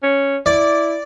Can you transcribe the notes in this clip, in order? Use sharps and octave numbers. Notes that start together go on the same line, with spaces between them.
C#4
E4 D5